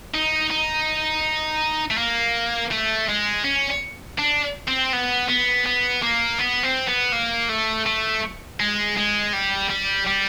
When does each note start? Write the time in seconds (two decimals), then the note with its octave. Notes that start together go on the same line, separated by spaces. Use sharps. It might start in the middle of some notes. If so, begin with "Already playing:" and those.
0.14 D#4
0.50 D#4
1.90 A3
1.97 A#3
2.71 A3
3.09 G#3
3.44 C#4
4.19 D4
4.68 C4
4.92 B3
5.29 B3
5.66 B3
6.03 A#3
6.39 B3
6.63 C4
6.88 B3
7.13 A#3
7.49 A3
7.86 A3
8.60 G#3
8.97 G#3
9.33 G3
9.70 G3
10.07 G3